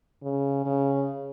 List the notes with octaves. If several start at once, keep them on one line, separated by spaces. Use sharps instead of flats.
C#3
C#3